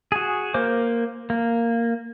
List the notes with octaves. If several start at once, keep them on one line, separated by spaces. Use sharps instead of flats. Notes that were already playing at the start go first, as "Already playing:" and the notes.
F#4 G#4
A#3 A#4 C5 D6
A#3